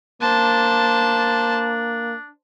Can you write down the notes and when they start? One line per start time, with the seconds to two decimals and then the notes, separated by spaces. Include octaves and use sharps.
0.22 A#3 D4 C5 A5